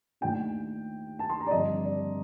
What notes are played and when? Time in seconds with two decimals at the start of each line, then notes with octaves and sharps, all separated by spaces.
0.21 D#2 D#3 A3 D4 F4 G5
1.19 A5
1.30 C6
1.41 A#5
1.47 D5
1.51 G2 D3 F3 C4 D#5
1.84 D5